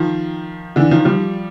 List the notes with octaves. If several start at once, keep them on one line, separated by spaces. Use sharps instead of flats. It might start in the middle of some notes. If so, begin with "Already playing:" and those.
Already playing: D#3 F3
D3 E3
D#3 F3
F3 G3